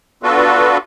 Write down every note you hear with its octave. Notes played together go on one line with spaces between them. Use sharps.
B3 D4 F4 F#4 A4 B4